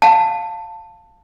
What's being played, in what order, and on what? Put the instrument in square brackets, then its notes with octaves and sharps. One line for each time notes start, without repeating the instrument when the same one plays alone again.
[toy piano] F5 A5